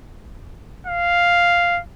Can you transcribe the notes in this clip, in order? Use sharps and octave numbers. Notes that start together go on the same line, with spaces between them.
F5